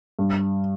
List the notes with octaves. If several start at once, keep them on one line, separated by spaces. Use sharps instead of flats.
G2